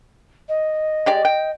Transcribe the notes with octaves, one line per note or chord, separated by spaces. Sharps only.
D#5
G#3 G4 D5
G5